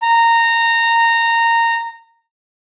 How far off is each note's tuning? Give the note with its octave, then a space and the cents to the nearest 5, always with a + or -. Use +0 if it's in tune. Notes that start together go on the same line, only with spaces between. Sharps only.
A#5 -15